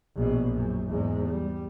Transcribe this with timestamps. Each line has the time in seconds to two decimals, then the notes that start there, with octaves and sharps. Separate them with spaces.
0.17 A#1 B2
0.55 F#2
0.88 E2 G#2
1.28 G3